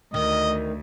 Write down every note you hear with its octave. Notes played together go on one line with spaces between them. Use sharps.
D2 D#3 D#5